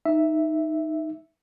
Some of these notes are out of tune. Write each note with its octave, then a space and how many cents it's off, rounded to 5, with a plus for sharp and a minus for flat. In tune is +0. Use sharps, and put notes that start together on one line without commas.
D#4 +0 E5 +0